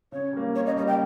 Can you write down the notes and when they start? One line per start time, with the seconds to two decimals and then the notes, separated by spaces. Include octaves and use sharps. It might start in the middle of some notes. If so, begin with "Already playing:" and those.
0.12 C#3 C#5
0.33 G3 A#3
0.55 C#3 C#5
0.66 D#5
0.76 G3 D#5
0.80 A#3
0.87 G5